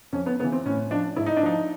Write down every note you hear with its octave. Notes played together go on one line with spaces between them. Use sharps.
F2 C#4
B3
C#3 E3 B3
C4
A2 C#4
F3 D4
G#2 E4
D#4
D4
F3 D#4